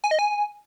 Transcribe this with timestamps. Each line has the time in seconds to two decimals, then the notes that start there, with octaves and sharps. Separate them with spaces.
0.04 G#5
0.11 D#5
0.19 G#5